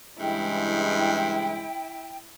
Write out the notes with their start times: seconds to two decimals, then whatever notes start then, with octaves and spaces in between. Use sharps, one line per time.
0.20 G2 C#3 E3 G#3 E4 G5